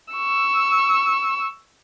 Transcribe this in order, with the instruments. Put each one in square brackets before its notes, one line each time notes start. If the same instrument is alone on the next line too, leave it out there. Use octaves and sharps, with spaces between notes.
[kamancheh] C#6 E6